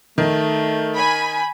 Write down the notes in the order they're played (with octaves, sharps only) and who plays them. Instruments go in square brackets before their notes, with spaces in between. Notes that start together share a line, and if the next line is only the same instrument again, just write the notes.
[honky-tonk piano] D#3 [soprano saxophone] A3
[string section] G#5 B5